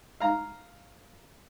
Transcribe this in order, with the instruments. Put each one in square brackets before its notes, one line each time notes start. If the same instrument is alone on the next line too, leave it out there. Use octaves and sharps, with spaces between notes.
[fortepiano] F5 A#5